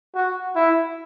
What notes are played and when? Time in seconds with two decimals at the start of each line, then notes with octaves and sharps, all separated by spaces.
0.15 F#4
0.56 E4